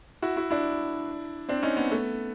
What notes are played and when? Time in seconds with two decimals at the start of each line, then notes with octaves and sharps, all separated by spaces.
0.22 E4 F#4
0.37 E4 F#4
0.51 D4 E4
1.49 C4 D4
1.63 C#4 D#4
1.77 B3 C#4
1.91 A3 B3